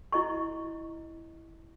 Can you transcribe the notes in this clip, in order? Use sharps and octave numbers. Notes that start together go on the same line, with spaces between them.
E4 D#5 C#6